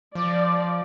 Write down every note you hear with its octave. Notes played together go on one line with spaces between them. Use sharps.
F3 D5